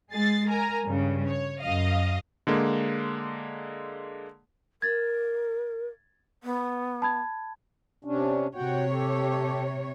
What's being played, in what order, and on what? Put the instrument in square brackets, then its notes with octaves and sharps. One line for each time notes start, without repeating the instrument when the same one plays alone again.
[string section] G#3 G#4 A6 C7
A#4 G#5 A#5
G2 C#3
C#5
F#2 D#5 F5
[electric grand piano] D3 G#3 A#3
[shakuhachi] A#4 [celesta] G#6 A6
[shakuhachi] B3
[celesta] A5 B5 G#6
[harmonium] C3 C#4 D4
[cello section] C3 C#5 [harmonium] F#4 F#5 G5
[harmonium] G4 A4